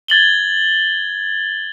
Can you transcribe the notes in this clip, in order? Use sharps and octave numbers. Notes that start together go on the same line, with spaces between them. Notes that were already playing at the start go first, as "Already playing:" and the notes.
G#6 A6 F#7 G7